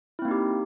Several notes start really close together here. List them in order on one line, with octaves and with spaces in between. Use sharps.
E4 C4 A#3 D#4 G4